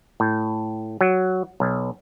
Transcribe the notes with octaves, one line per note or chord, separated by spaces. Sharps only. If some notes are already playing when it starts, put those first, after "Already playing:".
A2
F#3
B1